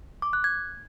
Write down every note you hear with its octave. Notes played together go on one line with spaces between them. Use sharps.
D6
F#6
G#6